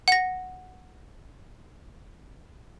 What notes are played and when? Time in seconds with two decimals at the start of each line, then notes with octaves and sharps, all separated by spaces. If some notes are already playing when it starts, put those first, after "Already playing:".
0.08 F#5 A#6